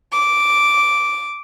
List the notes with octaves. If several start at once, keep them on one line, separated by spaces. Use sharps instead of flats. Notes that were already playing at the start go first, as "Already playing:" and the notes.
D6